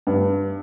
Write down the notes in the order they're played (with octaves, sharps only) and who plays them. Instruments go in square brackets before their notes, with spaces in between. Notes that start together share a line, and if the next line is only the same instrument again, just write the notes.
[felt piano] G2